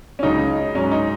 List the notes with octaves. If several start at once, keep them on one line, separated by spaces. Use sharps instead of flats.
C#4
C#2 C#3 F#3 D#4
G#2 F#3 C#4
D#4